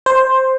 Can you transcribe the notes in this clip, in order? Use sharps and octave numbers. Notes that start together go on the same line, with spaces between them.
C5